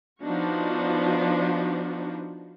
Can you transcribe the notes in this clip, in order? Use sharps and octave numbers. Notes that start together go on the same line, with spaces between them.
F3 B3 D4 D#4 F#4